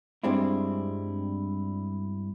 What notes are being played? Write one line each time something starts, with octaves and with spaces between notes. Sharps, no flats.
G2 G3 G#3 C4 D4 E4